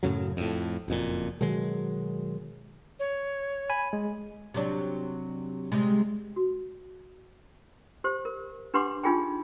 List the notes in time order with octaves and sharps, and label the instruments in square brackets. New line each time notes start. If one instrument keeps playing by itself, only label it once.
[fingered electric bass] F#2 A2 C#3 F#3
F2 A2
F#1 F2 A#2
B2 D#3 F#3 G#3
[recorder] C#5
[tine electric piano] G#5 B5
G#3
[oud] C3 F#3 D4
C3 G3 G#3
[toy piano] F#4
G4 C5
A#4
D4 G4 B4 F#5 C6 D6
D4 D#4 F4 G#4 G5 G#5